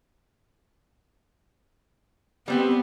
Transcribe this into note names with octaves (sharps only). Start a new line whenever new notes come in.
G3 B3 C4 G4